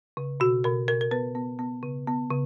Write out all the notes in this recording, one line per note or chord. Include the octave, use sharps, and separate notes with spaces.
C#3
B2 F#4
B2 A#4
B2 A#4
A#4
B3 B4
B3
B3
C#3
B3
C#3